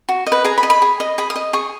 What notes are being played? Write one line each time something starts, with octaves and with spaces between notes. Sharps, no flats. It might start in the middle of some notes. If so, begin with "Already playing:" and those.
F#4
D#5
B4
G#4 A#5
B5
D#5
B5
G#4
D#5
G#4 B5
D#6
D#5
G#4 C#6